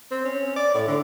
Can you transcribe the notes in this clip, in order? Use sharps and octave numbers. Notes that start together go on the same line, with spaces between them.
C4
C#4
D5
A2
D3